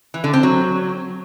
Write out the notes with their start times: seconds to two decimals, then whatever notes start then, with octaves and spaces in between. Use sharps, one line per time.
0.14 E3
0.24 D3
0.33 C4
0.43 F#3